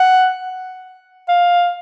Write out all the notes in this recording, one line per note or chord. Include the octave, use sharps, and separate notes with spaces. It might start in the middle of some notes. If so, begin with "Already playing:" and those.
Already playing: F#5
F5